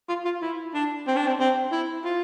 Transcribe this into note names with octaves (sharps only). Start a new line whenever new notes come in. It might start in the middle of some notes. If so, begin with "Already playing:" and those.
F4
F4
E4
D4
C4
D4
C4
C4
E4
F4